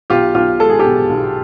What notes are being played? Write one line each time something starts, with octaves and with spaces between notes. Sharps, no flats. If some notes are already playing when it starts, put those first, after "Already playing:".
B1 F4 G4
B1 F4 G4
G#3 A4
G#4
G4 A4
B2
B1